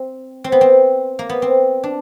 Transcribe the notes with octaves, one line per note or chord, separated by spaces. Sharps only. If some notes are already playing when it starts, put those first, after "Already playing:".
Already playing: C4
C4
B3
C4
A#3
B3
C4
D4